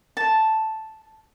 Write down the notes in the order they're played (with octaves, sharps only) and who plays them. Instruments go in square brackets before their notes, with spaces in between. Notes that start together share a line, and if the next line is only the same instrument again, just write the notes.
[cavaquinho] A5